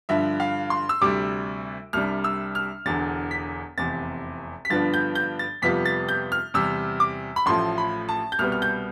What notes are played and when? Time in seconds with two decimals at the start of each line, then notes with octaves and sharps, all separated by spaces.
0.09 G2 D3 F3 E5
0.40 F5
0.70 C6
0.89 E6
1.01 D2 C3 G3 D6
1.93 C2 C3 G3 D4 F6
2.24 E6
2.55 F6
2.86 E1 E2 D3 A6
3.31 B6
3.78 F1 E2 C3 A6
4.65 B6
4.70 G2 D3 F3 B3 D4 A6
4.94 G6
5.15 G6
5.39 A6
5.62 F2 C3 G3 B3 F4 B6
5.86 A6
6.09 G6
6.32 F6
6.54 E2 C3 G3 E6
7.00 D6
7.36 B5
7.46 A1 A2 F3 A3 C6
7.78 B5
8.09 A5
8.32 G6
8.39 C2 B2 G3 B3 F6
8.52 F6
8.62 G6